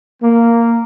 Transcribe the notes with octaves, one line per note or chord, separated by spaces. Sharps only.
A#3